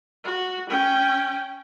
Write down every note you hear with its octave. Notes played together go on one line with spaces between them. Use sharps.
F#4
C#4 G5